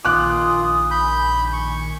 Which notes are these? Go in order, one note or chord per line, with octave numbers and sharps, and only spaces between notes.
A#1 D#3 F4 G#5 D6 D#6 F#6
B5 G6
C#6